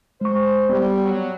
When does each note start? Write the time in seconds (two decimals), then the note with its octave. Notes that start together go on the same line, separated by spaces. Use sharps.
0.21 G#3 C5 C#6
0.69 G3 B3
1.03 F#3